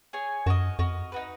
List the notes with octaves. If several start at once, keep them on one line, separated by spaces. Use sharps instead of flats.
G#4 C#5 G#5
F#2 F#4 A#4 D#5
F2 F#4 A#4 D#5
D#4 F#4 B4